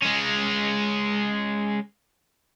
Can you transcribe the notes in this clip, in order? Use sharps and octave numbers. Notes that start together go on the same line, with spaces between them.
G#3 C#4